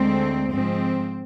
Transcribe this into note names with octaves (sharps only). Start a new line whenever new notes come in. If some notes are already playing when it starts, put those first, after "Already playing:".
Already playing: D2 D3 G#3 C4
G#2 F3 G#3 C4